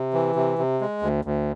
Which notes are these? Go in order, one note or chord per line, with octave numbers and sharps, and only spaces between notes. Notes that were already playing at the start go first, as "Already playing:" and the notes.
Already playing: C3
E3
C3
C3
G#3
D2
D2